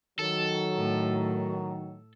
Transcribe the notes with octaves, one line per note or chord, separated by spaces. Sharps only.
D#3 F#3 A4
A2